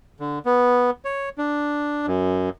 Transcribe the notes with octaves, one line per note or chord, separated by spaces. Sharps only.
D3
B3
C#5
D4
F#2